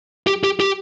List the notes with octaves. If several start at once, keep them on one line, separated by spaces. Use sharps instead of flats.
G4
G4
G4